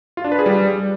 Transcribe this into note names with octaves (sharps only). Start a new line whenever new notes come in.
F4
D4
B4
G#4
G3